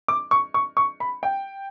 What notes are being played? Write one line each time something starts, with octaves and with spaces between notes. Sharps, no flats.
D6
C#6
C#6
C#6
B5
G5